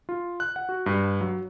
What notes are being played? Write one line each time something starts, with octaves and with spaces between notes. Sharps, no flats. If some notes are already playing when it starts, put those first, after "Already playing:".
F4
F#6
F#5
F#4
G2
F#3